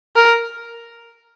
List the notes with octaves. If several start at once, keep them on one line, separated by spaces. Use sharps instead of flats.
A#4